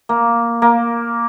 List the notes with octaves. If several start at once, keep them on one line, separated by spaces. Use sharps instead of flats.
A#3
A#3